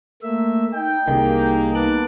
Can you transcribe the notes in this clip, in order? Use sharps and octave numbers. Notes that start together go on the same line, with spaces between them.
A3 A#3 E5
D#4 G5
C2 D#3 A#3 D#4 G4 G#4
B3 A5 D6 F#6